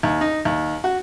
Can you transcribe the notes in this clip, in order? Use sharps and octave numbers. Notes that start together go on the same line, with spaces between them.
D#2
D#4
D#2
F#4